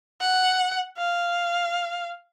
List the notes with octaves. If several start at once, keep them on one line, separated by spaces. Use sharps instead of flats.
F#5
F5